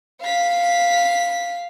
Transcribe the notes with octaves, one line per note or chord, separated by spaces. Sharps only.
F5 B6